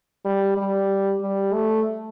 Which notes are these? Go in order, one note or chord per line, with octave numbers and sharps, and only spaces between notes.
G3
G3
G3
A3